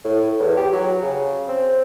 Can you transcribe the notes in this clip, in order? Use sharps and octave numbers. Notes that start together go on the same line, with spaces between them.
A2
E2
G4
F#3
C#3
C4